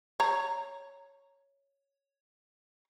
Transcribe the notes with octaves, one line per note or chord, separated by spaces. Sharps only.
C#5 A#5